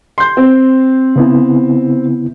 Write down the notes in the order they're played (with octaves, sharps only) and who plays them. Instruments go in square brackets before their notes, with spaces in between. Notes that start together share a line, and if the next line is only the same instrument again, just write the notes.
[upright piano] C6 G6
C4
[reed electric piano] C#3 B3 E4